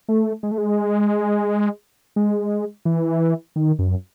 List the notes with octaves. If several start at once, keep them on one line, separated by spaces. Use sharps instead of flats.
A3
G#3
A3
G#3
G#3
E3
D#3
F#2